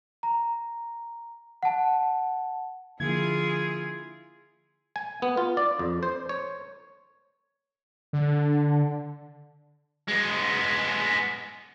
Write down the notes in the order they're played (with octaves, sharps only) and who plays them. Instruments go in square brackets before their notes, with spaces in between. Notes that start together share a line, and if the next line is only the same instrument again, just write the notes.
[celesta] A#5
F#5 A5
[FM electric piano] D3 F3 A#3 [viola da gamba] E4 F4 G#4 [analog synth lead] G#6
[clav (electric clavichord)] G#5
B3
F4
D5
F2
C5
C#5
[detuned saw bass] D3
[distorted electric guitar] G#3 B3